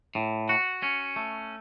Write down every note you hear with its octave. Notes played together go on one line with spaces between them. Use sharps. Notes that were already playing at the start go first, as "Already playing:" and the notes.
A2
F#4
C#4
A3